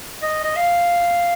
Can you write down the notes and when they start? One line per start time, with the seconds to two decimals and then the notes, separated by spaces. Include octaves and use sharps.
0.23 D#5
0.44 D#5
0.56 F5